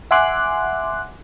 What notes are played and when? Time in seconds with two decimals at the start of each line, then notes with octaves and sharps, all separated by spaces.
0.11 E5 F#5 G#5 C6 D6 F#6